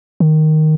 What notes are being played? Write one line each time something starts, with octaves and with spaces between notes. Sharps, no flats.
D#3